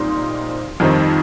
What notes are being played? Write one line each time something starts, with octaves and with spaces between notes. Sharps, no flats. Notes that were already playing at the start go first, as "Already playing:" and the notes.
Already playing: A#2 G3 C4 D#4 C6
F2 D#3 G3 C4 D#4